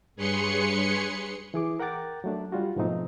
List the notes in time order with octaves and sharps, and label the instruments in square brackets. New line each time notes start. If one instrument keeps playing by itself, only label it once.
[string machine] G2 G#4 B4 C#5 C6 C#7
[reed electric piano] E3 G#4 D6
A#4 F#5 G5 D6 A6
F#3 A3 D4
G3 F4 F#4
G#2 B2 F3 A3 C4 D#4